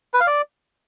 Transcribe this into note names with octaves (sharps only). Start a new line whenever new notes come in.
B4
F5
D5